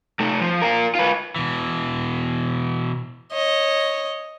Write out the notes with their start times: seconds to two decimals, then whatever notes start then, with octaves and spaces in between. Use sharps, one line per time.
0.20 C3 A3
0.41 F3
0.62 F4 A#4
0.95 F4 B4
1.36 B2 E3
3.32 C#5 D#5